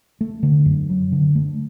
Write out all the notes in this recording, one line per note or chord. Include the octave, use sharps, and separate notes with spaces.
A3
D3
F#2
F#3
D3
A3